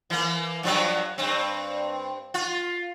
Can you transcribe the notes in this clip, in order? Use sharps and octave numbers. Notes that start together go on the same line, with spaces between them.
E3 A#3
G2 F3 F#3
G2 C4
F4